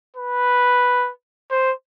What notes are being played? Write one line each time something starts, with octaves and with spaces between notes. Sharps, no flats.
B4
C5